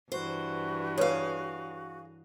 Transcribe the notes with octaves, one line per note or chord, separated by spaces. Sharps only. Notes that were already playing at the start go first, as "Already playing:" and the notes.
G2 E3 F#4 C5
G#4 B4 C#5 F5